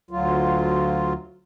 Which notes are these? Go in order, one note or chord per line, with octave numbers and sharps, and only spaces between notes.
D2 F#3 F4